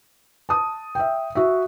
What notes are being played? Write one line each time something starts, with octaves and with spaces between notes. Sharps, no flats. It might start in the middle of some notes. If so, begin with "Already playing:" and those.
A5 D#6
E5 G5
F#4 E5